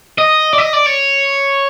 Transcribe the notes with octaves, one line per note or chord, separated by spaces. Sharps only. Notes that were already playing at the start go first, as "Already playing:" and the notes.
D#5
D5
D#5
D5
C#5